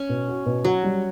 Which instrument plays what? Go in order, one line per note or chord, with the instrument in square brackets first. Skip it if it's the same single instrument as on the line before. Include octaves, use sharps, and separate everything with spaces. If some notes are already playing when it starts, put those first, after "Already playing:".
Already playing: [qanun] C#4
[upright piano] B2
F#4
B2
[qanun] F#3 [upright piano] F#4
[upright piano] G3